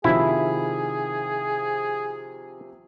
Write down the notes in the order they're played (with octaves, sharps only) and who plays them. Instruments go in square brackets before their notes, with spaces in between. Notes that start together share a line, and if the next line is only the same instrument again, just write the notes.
[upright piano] C3 D#3 F3 [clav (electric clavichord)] E4 [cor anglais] G#4